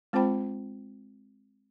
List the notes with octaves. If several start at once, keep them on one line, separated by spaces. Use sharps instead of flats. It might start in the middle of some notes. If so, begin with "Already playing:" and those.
G#3 C4 F4 C5 G5 B5